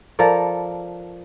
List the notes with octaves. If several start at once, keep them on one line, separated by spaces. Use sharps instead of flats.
F3 A4 A#4 D5